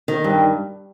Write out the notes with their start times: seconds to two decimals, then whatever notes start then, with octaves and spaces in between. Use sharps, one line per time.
0.08 D#3
0.24 G2